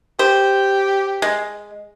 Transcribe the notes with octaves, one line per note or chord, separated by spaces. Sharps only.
G4 C5
G#3